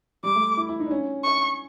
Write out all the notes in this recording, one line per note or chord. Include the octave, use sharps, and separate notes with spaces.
G3 D6
A3
E4
E4
D#4
D4
C#4
C#6